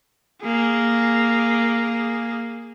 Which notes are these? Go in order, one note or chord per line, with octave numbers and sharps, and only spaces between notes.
A#3 G#4